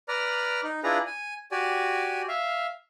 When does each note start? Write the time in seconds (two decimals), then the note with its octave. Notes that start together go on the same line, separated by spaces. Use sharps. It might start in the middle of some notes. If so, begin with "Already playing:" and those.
0.08 B4 D5 A#5 F6
0.63 D#4
0.84 D4 E4 F4 G#4 B4 A#5
1.06 G#5
1.52 F#4 G4 D5 G#5
2.28 E5 F5